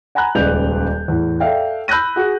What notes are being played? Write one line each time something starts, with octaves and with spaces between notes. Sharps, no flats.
F#5 G#5 A#5 B5 F#6
D#1 C#2 B4 D5 G6 F7
E2 A2
A4 D5 E5 F5 G5
B5 E6 F#6 G6 A#6 D#7
F#4 G#4